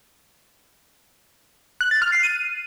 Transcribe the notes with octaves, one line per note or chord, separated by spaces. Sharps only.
F#6
A6
F6
C7
D#7